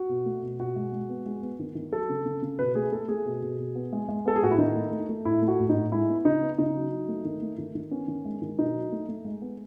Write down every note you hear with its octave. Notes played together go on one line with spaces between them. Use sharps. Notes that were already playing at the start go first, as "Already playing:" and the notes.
Already playing: F#4
B2
A3
B2
B2 F#4
G#3
G#3
B3
G#3
B3
D#3
D#3
F#3 A4
C#3
C#3
C#3
B2 B4
A3 G#4
A3 A4
A3 G#4
B2
B2
B2
B3
G#3
G#3
B3 A4
G#4
A2 F#4
E4
D#3 D#4
A3
A3
A3
A2 E4
A3
F#4
A2
D#4
A2
G#3 E4
B3
C#3 D#4
B3
C#3 D#4
F#3
F#3
A3
D#3
A3
D#3
D#3
B3 C#4
D#3
G#3
D#3
B2 D#4
F#3
A3
A3
G#3
B3